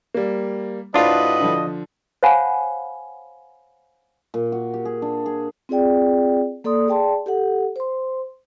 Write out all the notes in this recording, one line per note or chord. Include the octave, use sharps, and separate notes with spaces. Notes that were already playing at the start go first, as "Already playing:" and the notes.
G3 A#3
A2 D4 F4 F#4 B4 C5 D#5
D3 F3
C5 C#5 F5 F#5 G#5 B5
A#2
F#4
G4
G#4
D4
G#4
C4 F4 G#4 D5 G5
A#3 A4 D5 C6 D#6
G#4 D5 G5 A5 C6
G4 A4 F#5
C5 C6